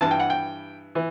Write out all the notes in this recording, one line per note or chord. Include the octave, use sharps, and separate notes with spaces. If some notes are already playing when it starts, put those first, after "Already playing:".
G2 E3 A5
G5
F#5
G5
E3